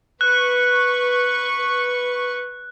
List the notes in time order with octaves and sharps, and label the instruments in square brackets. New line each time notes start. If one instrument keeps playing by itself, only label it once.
[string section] B4 C#6 [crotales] F#6